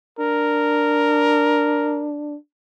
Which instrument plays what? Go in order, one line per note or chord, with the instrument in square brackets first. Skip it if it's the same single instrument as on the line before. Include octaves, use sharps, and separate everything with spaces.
[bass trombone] D4 [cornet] A#4